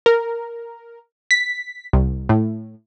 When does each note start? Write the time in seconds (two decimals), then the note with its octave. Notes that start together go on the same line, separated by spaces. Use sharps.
0.06 A#4
1.31 B6
1.93 C2
2.29 A2